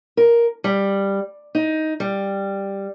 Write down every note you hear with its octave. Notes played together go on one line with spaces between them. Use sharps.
A#4
G3
D#4
G3